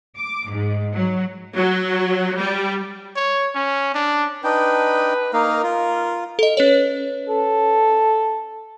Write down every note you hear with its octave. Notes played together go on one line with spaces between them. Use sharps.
D6
G#2
F#3
F#3
G3
C#5
C#4
D4
D4 D#4 B4 G5
A#3 D#4 A#4 F5
F4
A4 D#5
C#4 B4 C#5
A4